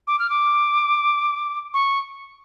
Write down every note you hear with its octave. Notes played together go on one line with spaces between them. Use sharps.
D6
F6
D6
C#6